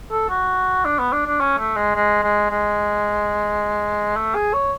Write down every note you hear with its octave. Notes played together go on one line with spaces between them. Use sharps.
A4
F#4
D4
B3
D4
D4
C#4
A3
G#3
G#3
G#3
G#3
A3
G#4
C#5